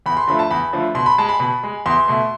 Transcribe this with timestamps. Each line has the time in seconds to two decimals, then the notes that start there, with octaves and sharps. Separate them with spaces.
0.06 E2 B5
0.17 C6
0.28 D3 F3 A3 B5
0.39 A5
0.50 E2 B5
0.73 D3 F3 A3
0.95 B2 C6
1.06 B5
1.18 G#3 A5
1.29 B5
1.40 B2
1.63 G#3
1.86 E2 C6
2.08 B2 A3